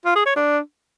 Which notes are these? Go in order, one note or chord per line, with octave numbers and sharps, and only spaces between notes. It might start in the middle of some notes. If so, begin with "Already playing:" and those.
F4
G#4
C#5
D4